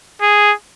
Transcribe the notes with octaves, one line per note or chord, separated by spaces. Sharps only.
G#4